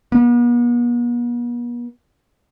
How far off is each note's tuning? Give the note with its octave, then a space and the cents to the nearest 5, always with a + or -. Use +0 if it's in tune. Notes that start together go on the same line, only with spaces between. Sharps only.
B3 -45